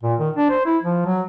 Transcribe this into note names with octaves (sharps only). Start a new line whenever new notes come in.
A#2
D#3
D4
C5
E4
F3
F#3